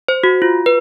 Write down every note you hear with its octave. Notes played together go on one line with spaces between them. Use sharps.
C5
F#4
F4
B4